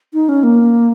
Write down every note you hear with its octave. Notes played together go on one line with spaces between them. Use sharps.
D#4
C#4
A#3